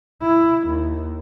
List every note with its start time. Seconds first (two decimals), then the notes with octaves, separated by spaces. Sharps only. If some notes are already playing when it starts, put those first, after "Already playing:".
0.22 E4
0.67 D#2